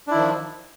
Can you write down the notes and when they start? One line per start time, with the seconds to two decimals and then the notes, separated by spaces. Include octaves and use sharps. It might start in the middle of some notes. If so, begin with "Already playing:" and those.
0.07 D4
0.11 E4
0.15 D#3
0.18 F3